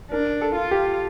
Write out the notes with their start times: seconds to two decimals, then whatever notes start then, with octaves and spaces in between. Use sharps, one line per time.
0.11 D4 A#4
0.41 A4
0.56 F4
0.71 G4